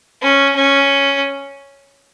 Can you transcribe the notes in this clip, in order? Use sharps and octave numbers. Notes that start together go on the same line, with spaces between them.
C#4
C#4